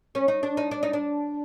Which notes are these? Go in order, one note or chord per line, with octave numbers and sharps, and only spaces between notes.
C#4
D#4
D4
D#4
D4
D#4
D4